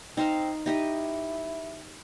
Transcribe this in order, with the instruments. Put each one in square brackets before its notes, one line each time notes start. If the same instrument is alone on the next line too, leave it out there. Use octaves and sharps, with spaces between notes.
[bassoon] C4 [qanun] D#4 C5 F5
[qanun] D#4 G4 D#5 [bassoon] E4